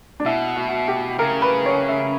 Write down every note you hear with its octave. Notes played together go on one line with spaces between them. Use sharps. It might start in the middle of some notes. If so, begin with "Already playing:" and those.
D4
B2 E4
F#4
G4
C#3 A#4
B4
C#5
E5